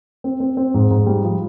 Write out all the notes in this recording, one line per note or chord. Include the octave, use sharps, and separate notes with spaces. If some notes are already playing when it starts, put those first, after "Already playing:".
C4
C4
C4
G#2
G#2
G3
F3